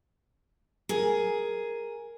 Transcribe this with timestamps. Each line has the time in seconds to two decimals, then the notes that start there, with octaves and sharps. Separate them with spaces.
0.89 G#4 A#4